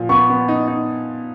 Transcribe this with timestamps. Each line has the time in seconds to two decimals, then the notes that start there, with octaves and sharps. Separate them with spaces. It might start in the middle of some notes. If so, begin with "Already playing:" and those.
Already playing: A#2 F3
0.09 B3 C#6
0.29 B3
0.48 D#4
0.68 D#4